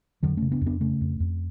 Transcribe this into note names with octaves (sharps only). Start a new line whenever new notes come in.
F2 D3 F#3
C#3 A3 C#4
B3 D4
F2
B3 D4
C#3 A3 C#4
F2
F2